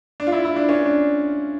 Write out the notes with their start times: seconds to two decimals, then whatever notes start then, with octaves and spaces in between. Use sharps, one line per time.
0.20 D4
0.27 F4
0.32 E4
0.45 E4
0.56 D4
0.69 C#4
0.86 D4